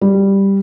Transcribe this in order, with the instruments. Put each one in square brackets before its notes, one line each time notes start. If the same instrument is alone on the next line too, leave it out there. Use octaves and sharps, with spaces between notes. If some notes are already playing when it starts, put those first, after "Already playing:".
[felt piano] G3